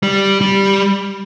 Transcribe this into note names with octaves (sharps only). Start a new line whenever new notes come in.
G3
G3